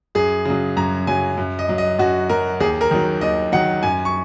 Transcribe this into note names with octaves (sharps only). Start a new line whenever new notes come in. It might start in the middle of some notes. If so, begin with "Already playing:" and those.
F#2 G#4
C#3 F#3
F#2 A#5
C#3 F#3 G#5
F#2
D#5
F#3
D#5
F#2 F#4
F#3 A#4
D#2 G#4
A#4
D#3 F#3
D#2 D#5
D#3 F#3 F#5
F#2 G#5
C#6